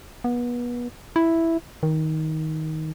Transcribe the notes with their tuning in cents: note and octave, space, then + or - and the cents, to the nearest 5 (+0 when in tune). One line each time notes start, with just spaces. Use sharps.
B3 -30
E4 +0
D#3 +15